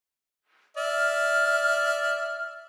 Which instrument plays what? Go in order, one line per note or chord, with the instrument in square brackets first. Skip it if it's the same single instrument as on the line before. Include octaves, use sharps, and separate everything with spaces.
[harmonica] D5 E5 [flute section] F6